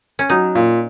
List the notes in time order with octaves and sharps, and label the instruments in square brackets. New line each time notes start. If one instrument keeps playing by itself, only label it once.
[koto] C#4
[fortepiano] F#3 [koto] D#4
[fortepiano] A#2